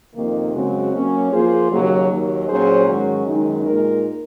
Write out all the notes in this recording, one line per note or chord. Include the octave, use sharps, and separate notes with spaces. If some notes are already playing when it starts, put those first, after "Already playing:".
F2 C3 D#3 A#3
F#2 C#3 G#3 C4 F#4
F#3 A#3 C#4
F3 A#3 F4 G#4 C5
D#2 C#3 F#3
D#2 D#3 F#3
A#2 F#3 C#4 G#4 C5
G#2 D#3 F#3 C#4 F#4
F#2 D#3 G#3 D#4
A#2 G#3 D#4 A#4